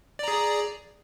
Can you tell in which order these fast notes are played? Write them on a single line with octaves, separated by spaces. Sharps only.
D5 A#5 G#4